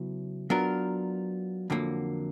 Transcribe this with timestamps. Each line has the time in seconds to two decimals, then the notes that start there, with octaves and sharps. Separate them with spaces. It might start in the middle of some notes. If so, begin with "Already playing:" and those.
Already playing: C#3 F#3 B3 E4
0.50 F#3 B3 D4 F4 A#4
1.70 F2 D3 F#3 A#3